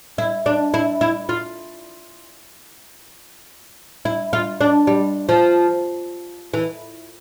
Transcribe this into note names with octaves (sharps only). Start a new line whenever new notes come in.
E4
D4
E4
E4
F4
E4
F4
D4
G3
F3
E3